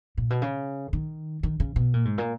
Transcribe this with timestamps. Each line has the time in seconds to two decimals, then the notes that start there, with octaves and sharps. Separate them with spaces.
0.17 A#2
0.30 B2
0.42 C#3
0.93 D#3
1.43 D#3
1.60 C#3
1.76 B2
1.93 A#2
2.05 G#2
2.18 A#2